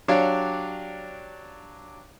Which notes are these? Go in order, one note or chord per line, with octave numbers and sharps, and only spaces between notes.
F#3 D4 G4 C#5 D5 F5